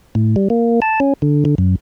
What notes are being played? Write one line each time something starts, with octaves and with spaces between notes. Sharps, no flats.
A2
G3
A#3
A5
C#4
D3
D3
F#2